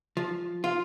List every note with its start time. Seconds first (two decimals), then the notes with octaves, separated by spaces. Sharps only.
0.17 F3
0.64 F4